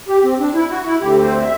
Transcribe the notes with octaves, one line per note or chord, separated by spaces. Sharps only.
G4
C4
D4
E4
F#4
E4
D2 D3 A3 C4 G4
C5
E5